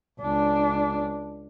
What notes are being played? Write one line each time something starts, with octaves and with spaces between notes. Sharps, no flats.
C#2 D4